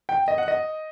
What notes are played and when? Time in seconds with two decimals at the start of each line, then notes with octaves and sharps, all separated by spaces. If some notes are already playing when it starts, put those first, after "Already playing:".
0.09 G5
0.28 D#5
0.38 F#5
0.48 D#5